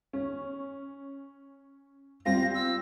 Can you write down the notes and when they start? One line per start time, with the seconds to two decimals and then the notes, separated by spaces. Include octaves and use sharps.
0.13 C#4
2.25 G3 C4 F4 A#6
2.55 E6